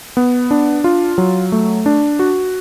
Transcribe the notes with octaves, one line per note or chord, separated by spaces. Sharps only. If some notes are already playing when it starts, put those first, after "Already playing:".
B3
D4
F4
F#3
A3
D4
F#4